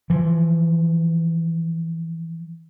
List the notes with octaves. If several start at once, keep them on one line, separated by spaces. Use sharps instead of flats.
E3 F3